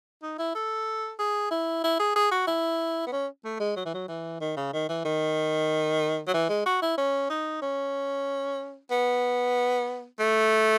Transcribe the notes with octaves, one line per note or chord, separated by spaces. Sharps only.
D#4
E4
A4
G#4
E4
E4
G#4
G#4
F#4
E4
B3
C#4
A3
G#3
F#3
E3
F#3
E3
D#3
C#3
D#3
E3
D#3
F#3
E3
G#3
F#4
E4
C#4
D#4
C#4
B3
A3